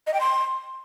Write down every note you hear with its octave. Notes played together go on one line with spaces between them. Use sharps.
D#5
G5
C6